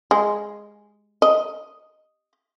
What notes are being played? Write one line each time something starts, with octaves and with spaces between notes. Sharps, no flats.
G#3
D#5